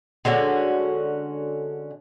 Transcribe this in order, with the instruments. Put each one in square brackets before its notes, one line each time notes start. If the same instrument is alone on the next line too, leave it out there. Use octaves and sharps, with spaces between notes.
[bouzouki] D3 G#3 C#4 F#4